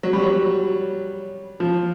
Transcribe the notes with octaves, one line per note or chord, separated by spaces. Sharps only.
F#3
G3
F#3
F3